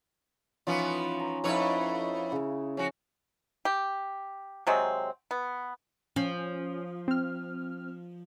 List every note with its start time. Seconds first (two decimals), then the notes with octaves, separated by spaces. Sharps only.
0.67 E3 F3 B3 C#4 D#4 F4
1.19 A#5
1.44 F2 D#4 E4 B4 C#5
2.32 C#3
2.77 F3 C#4 F#4
3.65 G4
4.67 C3 F#3 G#3 C4
5.31 B3
6.16 F3 C#4
7.08 C4 F6